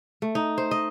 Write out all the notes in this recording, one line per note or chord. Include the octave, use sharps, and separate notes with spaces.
A3
D#4
C5
D#5